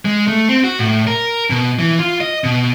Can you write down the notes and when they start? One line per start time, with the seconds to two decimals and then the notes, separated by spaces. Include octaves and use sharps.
0.05 G#3
0.27 A3
0.49 C4
0.64 F#4
0.79 A2
1.07 A#4
1.50 B2
1.79 E3
1.99 F4
2.21 D#5
2.44 B2